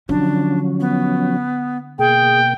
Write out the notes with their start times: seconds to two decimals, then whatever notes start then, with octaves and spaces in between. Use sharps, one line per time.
0.09 D3 F3 F#3 C#4 D4
0.80 B3
1.99 B2 A#3 G#4 G5